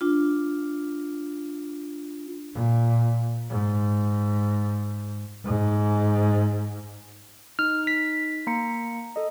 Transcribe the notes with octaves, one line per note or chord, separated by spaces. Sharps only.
D4 F4
A#2
G#2
G#2
D#4 F6
B6
A#3 A#5 C#7
A4 D#5